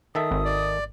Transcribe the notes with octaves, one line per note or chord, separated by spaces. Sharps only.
D#3 A4 E5 D#6
G#1
D5